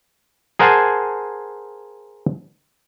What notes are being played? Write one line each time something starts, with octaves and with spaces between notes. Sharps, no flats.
G#4 A#4 C5 F#5 G#5 A5